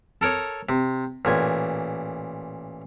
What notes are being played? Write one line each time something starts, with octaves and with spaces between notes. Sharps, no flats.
A4 A#4 C#5 D#6
C3
A1 A#2 G#5